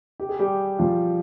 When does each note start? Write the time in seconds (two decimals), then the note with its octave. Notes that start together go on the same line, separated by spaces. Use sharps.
0.20 G4
0.29 G#4
0.39 G3 G4
0.79 F3 F4